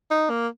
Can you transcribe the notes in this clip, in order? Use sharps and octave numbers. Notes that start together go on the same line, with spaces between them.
D#4
A#3